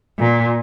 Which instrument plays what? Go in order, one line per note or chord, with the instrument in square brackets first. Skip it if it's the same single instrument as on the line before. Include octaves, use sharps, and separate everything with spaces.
[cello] A#2